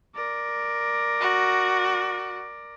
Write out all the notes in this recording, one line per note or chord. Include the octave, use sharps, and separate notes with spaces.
A#4 D5
F#4